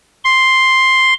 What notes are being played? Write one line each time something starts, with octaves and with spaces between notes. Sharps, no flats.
C6